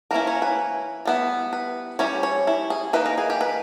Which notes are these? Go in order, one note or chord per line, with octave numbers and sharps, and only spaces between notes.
E3 A#3 C#4 E4 A#4
C#5
B4
G3 B3 E4
B4
G3 C#4 E4 C#5
C#5
E4
G#4
E3 A#3 D#4 B4
A#4
G#4
G4
B4